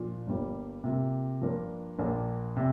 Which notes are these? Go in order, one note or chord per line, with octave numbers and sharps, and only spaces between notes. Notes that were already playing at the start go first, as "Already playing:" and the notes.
Already playing: A#2 F3 D4 F4
G1 G2 G3 A#3
C3 A#3 F4
G2 F3 A#3 D4 A#4
A#1 A#2 A#3 D4
C3